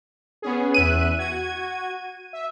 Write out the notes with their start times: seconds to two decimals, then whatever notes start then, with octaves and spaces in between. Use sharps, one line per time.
0.42 B3 C#4 G#4
0.74 E2 E5 F#6 D#7
1.19 F#4 G#6
2.33 E5